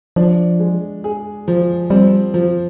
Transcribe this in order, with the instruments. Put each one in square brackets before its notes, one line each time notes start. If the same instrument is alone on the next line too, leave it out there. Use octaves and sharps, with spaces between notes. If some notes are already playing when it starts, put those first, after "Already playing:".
[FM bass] F3 [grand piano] D4
[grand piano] G#3
G#4
F3
[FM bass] G3 [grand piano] C4
[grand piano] F3